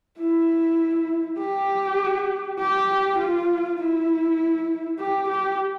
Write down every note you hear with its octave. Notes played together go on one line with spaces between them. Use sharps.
E4
G4
G4
F4
E4
G4
G4